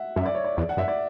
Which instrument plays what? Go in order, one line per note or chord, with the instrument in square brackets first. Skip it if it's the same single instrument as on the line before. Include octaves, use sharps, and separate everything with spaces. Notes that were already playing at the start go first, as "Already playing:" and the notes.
Already playing: [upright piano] E5 F#5
[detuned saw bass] F#2 [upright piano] E5
[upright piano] D5
C#5
D5
[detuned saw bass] E2 [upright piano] D5
[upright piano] F#5
[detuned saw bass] F#2 [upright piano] E5
[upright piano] D5